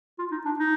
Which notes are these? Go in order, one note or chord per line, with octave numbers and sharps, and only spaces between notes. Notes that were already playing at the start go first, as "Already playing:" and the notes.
F4
D#4
D4
D#4